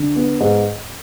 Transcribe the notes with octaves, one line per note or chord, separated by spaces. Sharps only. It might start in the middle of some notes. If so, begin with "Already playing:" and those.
Already playing: D3
B3
G#2